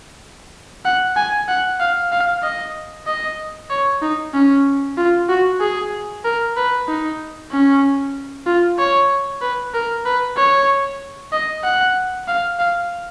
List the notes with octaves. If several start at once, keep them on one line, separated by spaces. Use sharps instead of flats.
F#5
G#5
F#5
F5
F5
D#5
D#5
C#5
D#4
C#4
F4
F#4
G#4
A#4
B4
D#4
C#4
F4
C#5
B4
A#4
B4
C#5
D#5
F#5
F5
F5